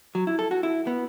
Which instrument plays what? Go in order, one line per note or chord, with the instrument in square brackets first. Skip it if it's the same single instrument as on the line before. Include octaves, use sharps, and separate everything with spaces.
[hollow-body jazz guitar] F#3
E4
A4
F#4
E4
B3